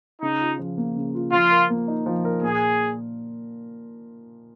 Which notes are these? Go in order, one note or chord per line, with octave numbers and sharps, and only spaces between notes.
C#3 D#4
F4
F3
A#3
C#3
F4
F3 F4
A#4
A#3
D#4
F3
A#4
A#2 G#4